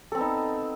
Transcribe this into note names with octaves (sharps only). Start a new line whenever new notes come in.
B3 C4 D#4 A4